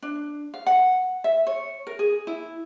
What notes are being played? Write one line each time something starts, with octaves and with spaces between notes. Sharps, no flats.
D4
F5
F#5
E5
C#5
A#4
G#4
E4